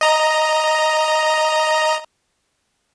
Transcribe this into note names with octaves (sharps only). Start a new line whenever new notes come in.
D#5 A#5